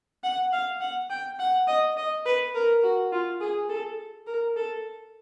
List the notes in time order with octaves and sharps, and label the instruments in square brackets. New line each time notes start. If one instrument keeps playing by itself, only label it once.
[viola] F#5
F5
F#5
G5
F#5
D#5
D#5
B4
A#4
F#4
F4
G#4
A4
A#4
A4